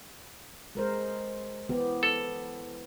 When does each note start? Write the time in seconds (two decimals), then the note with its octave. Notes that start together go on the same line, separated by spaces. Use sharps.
0.75 G#3 A#4 C5
1.69 E3 B3 G4
2.03 A4